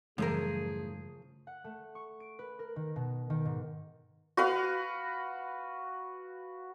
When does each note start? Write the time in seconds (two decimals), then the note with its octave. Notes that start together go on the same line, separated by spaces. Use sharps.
0.18 F#2 A2 C#3 E3 F3 G3 G#4 A#4
1.47 F#5
1.64 A3
1.95 C#6
2.20 D7
2.39 B4
2.59 A#4
2.76 D#3
2.96 B2
3.30 D#3
3.45 G#2
4.37 F#4 B4 F5